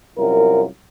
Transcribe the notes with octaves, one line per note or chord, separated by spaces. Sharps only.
C2 F#2 F4 A#4